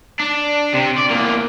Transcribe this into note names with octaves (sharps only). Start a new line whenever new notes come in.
D4
C3
D5
E2 A#3